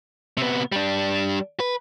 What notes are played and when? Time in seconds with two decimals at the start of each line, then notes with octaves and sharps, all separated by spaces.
0.37 C3 B3
0.72 G3 D4
1.60 B4